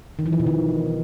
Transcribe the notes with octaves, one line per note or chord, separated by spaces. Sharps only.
D#3
E3
F3
B2
D#3